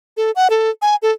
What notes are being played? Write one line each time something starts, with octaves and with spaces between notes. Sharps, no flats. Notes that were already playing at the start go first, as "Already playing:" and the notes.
A4
F#5
A4
G#5
A4